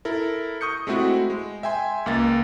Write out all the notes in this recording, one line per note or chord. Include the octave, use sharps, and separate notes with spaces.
E4 A4 A#4
C#6 D#6 G6 C#7
G#3 A3 C4 E4 F#4
G#3
E5 G5 G#5 C6
C#2 A#3 A6